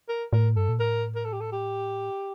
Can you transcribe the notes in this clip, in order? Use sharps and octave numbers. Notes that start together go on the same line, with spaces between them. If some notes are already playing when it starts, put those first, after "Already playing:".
A#4
A2 A#4
G2 A4
A#2
A2 A#4
A#4
A4
G4
A4
G4